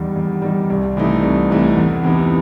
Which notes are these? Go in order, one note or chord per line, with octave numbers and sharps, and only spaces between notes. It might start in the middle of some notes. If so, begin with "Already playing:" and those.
Already playing: E2 D#3 G3
E2
D#3 G3
C2
C3 E3 A3 D#4
C2
C3 E3 A3 D#4
E2
C3 E3 B3 D#4